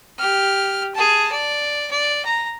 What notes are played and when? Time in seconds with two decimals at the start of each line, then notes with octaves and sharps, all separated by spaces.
0.19 G4 F6
0.95 G#4 A5
1.31 D5
1.91 D5
2.25 A#5